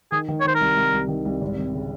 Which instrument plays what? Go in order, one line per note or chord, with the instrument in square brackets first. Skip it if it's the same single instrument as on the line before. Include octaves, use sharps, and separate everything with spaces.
[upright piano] D#3 [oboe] G#4
[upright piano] D#3
[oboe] C#5
[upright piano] D#3 [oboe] C5
[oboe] A#4
[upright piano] C2
C2
C2
D#3
C2
G#1
G#1
C#3